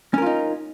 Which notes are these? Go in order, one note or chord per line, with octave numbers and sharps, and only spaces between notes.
C#4 D#4 F4 A#4